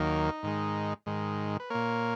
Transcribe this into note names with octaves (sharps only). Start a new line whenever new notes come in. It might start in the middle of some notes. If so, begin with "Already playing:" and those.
Already playing: D#2 D#3 F#3 A#3 D#4
G#2 D#3 G#3
G#2 D#3 G#3
B4
A#2 A#3 A#4 C#5